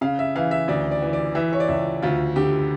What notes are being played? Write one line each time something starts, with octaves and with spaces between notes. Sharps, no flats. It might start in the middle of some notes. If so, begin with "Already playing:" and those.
C#3 F5
E5
E3 F5
E5
D2 D5
D5
E3
D5
E3 E5
C#5
D5
C#2 E5
D2 F4
D3 G4